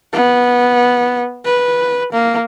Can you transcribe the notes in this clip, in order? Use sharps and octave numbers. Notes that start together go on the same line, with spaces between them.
B3
B4
A#3